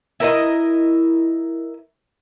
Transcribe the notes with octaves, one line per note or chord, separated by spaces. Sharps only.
E4 A#4 B4 D#5